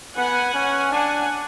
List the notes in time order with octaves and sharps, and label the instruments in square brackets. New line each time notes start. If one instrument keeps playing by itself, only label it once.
[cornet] B3 [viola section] F#5 G#5
[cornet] C#4
[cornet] D4 [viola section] F#5 G#5